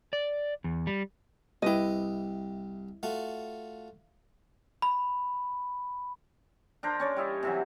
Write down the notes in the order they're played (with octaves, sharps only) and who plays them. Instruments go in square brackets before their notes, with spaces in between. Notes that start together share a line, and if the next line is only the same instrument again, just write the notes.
[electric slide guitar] D5
E2
G3
[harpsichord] C2 G4 [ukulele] E4 B4 D#5
[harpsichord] A3 F4 F#4
[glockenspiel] B5
[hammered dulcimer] D4 A#4 C5
C#4 C#5 D5
G3 E4 D#5
C3 E3 F#3